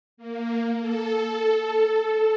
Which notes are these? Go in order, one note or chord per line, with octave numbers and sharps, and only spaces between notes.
A#3
A4